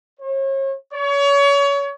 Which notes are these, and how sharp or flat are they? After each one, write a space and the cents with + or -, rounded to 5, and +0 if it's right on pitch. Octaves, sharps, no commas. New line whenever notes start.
C#5 -40
C#5 +30